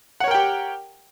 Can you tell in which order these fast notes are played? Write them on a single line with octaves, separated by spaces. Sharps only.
F#5 C#5 A#4 G5 G4